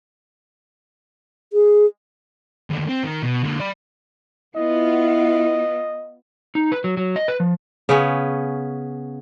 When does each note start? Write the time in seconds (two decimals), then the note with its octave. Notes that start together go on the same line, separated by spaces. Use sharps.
1.53 G#4
2.70 D#2 D3
2.89 C4
3.04 D#3
3.23 B2
3.44 D3 A#3
3.60 D5 B5
4.56 B3 E4 F4 D#5
6.55 D#4
6.72 B4
6.84 F#3
6.97 F#3
7.16 D#5
7.28 B4
7.40 F3
7.89 C#3 B3 C#4